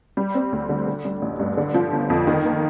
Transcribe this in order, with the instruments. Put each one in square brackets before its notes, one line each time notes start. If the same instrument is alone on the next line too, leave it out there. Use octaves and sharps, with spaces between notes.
[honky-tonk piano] G3
C4
D2
D3
D3
G3
A1
G2
D3
F3
G1
F2
D#3
A#3